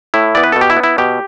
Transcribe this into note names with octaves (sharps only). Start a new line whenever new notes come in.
A2 E4
E3 B3 D5
B4
B2 A4
G4
E4
B3
E4
B2 G4